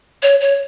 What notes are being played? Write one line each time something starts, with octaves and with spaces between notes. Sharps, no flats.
C#5
C#5